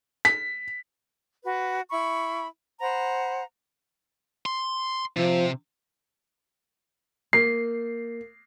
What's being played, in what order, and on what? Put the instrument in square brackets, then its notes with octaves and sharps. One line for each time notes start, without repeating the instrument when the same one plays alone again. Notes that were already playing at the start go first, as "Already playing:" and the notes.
[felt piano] B6
[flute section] F#4 B4
E4 B5 C#6
C5 F#5 A#5 B5
[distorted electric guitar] C6
[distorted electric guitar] C3 [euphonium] F3
[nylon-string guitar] A#3 [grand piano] C7